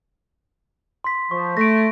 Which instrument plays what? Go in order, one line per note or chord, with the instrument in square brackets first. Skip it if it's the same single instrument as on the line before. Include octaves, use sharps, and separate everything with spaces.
[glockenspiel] C6 B6
[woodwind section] F3 [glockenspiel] C#6
[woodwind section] A3 [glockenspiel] A#6 D7